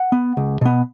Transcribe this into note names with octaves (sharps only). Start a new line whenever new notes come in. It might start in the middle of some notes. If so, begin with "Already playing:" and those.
Already playing: F#5
B3
C#2
B2 B3